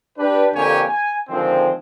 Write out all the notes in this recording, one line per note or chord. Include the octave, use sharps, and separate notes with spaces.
D4 G4 B4
F2 D3 A#3 G4 C#5 G#5
G#5
D3 D#3 F3 G#3 C4